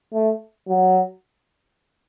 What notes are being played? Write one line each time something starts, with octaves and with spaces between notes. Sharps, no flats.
A3
F#3